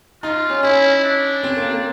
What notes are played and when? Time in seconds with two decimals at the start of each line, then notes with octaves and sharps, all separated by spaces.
0.23 D#4 F4
0.50 C#4
0.63 C#4 E4
1.04 D4
1.43 C4
1.57 A#3
1.70 A#3